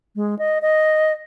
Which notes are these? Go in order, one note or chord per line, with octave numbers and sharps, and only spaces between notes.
G#3
D#5
D#5